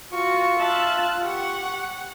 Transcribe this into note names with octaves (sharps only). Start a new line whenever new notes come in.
F4 F#4 C#6
E5 A5 E6 F#6
G4 F#5 C#6